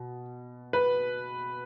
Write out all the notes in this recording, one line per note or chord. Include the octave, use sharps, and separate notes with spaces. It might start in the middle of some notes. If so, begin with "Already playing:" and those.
Already playing: B2
B4